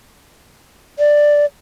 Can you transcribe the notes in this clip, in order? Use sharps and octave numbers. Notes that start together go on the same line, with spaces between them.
D5